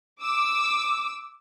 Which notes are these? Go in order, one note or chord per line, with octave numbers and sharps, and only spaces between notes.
D6 E6